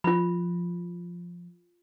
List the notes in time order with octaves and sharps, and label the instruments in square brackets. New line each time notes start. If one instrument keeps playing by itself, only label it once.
[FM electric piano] F3 [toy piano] F4 B5